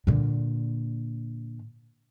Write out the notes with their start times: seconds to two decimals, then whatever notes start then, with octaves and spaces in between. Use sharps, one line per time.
0.07 A#2 D3